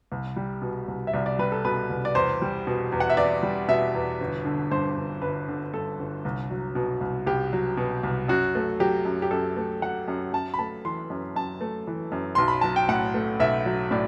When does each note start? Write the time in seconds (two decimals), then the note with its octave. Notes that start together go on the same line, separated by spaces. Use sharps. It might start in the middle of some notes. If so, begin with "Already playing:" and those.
0.12 C2
0.36 G3
0.62 B2
0.88 C2
1.07 E5
1.13 C2 D5
1.26 D5
1.39 G3 B4
1.52 A4
1.65 B2 B4
1.90 C2
2.05 D5
2.15 E2 C5
2.42 G3
2.67 B2
2.92 E2
3.00 F#5
3.10 E5
3.17 E2 D5
3.43 G3
3.68 B2 E5
3.95 E2
4.21 G1
4.45 D3
4.71 G2 C5
4.97 G1
5.22 G1 B4
5.48 D3
5.74 G2 A4
5.99 G1
6.25 C2
6.51 F#3
6.75 B2
7.01 C2
7.27 C2 G4
7.53 F#3
7.77 B2
8.03 C2
8.28 F#2 F#4
8.55 A3
8.80 F#3 G4
9.05 F#2
9.22 G4
9.31 F#2 A4
9.57 A3
9.82 F#3 F#5
10.08 F#2
10.33 F#2 A5
10.54 B5
10.59 A3 A5
10.85 E3 C6
11.10 F#2
11.36 F#2 A5
11.61 A3
11.87 E3
12.12 F#2
12.35 B1 C6
12.48 B5
12.61 F#3 A5
12.76 G5
12.88 A2 F#5
13.14 A3
13.40 B1 E5
13.66 F#3
13.91 A2 D5